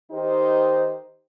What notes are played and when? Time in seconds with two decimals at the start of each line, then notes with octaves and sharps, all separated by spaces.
0.11 D#3 D#4 G4 C5